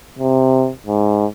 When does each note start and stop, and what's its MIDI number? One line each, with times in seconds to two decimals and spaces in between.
0.19 0.70 48
0.87 1.26 44